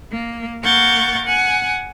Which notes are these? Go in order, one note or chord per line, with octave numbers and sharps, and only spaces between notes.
A#3
A#3 A#4 F#5 C#6 G6 A6
F#5 G#5